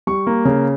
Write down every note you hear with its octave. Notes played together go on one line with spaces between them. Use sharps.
G3 C#6
A#3
C#3